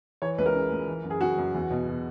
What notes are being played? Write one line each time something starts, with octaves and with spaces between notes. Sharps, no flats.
E3 C#5
C#2 B4
A#4
C#3
C#2
E3
F#2
G#4
C#3 F#4
F#2
E2
B2
B2